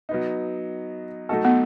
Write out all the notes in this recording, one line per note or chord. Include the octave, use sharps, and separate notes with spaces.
F#3 B3 D#4
F#3 A3 D#4 F#4 A4
B3